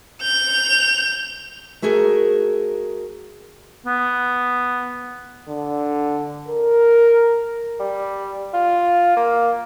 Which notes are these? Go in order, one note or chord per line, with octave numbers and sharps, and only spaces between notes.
G6 F7
A3 F#4 G#4 A#4
B3
D3
A#4
G3
F4
A#3